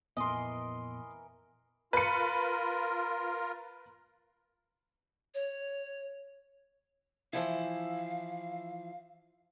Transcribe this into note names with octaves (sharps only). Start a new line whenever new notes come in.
F2 A#2 E3 B3 A#4 D#5 C6
F4 A#4 B4 C#7
C#5
E3 F3 E4 F5